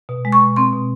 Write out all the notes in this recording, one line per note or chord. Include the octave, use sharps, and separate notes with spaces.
B2
G#3
C#6
B2
C4 C6
B2